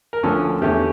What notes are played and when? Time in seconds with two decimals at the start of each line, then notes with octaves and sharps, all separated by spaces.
0.13 A#4
0.23 D2 D3 F3 C#4 A4
0.62 E2 D3 A3 C#4 G4